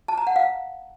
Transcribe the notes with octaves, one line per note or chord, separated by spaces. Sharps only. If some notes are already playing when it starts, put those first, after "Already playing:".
A5
A#5
F#5
F5